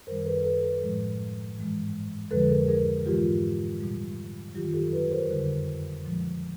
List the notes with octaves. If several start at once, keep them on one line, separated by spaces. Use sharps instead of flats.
F#2 D#3 G3 A#4 C5
A4 B4
A4 B4
A4 B4
A2 F3 G#3
G#2 E3 G#3
F2 D3 F3 G#3 A4 B4
G#4 A#4
G#4 A#4
G#2 E3 G#3 F4 G4
A#2 G3
F#2 D#3 F#3 F4 G4
G4 A4
A4 B4
A#4 C5
F2 D3 G3 A#4 C5
A#2 F3 G#3